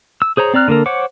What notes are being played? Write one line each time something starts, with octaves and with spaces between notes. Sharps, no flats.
E6
G#4 C5 C#5 A#5
C4 D5 A#5 F6 F#6
D3 A#3 A4 A#4
C5 C#5 F#5 D6